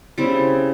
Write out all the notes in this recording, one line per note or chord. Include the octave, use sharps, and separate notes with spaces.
C#3 G3 C4 E4